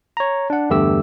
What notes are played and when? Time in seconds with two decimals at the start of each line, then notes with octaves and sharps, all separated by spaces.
0.17 C#5 A#5
0.50 D4 F#5
0.70 E2 G2 D3 A3 G4 E6